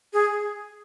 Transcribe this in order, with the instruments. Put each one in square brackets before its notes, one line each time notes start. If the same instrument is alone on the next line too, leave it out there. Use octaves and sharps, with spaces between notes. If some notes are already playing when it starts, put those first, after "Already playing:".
[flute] G#4